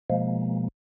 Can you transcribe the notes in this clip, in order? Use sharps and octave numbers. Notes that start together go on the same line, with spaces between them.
B2 F3 G#3 A#3